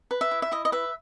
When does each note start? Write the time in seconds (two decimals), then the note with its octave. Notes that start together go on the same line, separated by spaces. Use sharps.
0.11 B4
0.21 E5
0.31 E4
0.42 E5
0.52 E4 D#5
0.65 D#5
0.72 B4 E5